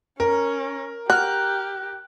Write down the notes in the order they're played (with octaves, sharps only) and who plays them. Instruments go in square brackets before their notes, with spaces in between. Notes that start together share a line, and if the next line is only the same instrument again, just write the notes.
[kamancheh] C#4 [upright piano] A#4
[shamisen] F#4 [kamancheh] G4 [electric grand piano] F6 F#6